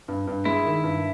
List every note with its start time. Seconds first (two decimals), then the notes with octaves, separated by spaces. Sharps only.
0.08 G2
0.27 G2
0.45 G#3 E4
0.65 D#3
0.84 G2